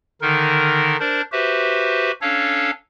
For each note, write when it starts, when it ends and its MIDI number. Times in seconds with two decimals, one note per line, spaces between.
0.22 0.96 50
0.22 0.96 51
0.22 0.96 63
0.22 0.96 70
1.00 1.22 62
1.00 1.22 70
1.00 1.22 72
1.00 1.22 74
1.32 2.11 66
1.32 2.11 67
1.32 2.11 71
1.32 2.11 72
1.32 2.11 76
2.21 2.71 61
2.21 2.71 62
2.21 2.71 69
2.21 2.71 73
2.21 2.71 77